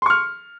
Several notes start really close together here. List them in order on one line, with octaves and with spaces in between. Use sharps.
C6 C#6 F6